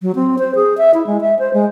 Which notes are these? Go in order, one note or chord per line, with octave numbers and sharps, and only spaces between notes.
F#3
C4
C5
G#4
E5
E4
G#3
E5
C5
G#3